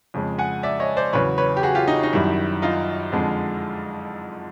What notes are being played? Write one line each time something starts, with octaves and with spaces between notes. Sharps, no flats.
F2 C#3 F3 G#3
F#5 G#5
D5 E5
C#5 D#5
C5 D5
E2 C#3 F#3 B4 C#5
B4 C#5
G4
F#4 G#4
F4 G4
D#4
D#4
F#2 D#3 G3 E4
D#4 F4
F2 D3 F3 G#3